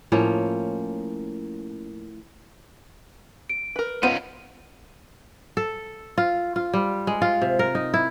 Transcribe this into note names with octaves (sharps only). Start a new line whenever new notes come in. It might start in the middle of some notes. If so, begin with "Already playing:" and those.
A2 F3 A#3 C#4
D7
A#4 B4
B3 C#4 D#4 F4 C5 D#7
A4
F4
F4
G3
G#3
F4
C3
A#4
D#4
E4